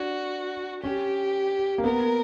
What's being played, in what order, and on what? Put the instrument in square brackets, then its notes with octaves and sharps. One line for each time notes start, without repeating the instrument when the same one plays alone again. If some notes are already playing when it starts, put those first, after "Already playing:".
Already playing: [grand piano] D4 [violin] F#4
[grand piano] C#4 [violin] G4
[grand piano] A#3
[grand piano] B3 [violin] A#4